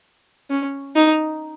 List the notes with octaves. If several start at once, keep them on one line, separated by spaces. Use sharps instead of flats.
C#4
D#4